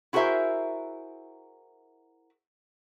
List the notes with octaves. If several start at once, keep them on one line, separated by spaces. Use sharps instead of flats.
E4 F#4 G#4 A#4 C5 E5